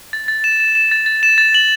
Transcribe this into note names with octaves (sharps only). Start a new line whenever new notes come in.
A6
A6
E7
E7
E7
A6
A6
E7
A6
F#7